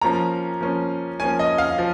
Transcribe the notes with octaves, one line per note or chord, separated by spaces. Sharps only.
F3 A#3 C#4 A#5
F3 A#3 C#4
F3 A#3 C#4 G#5
D#5
F5
F3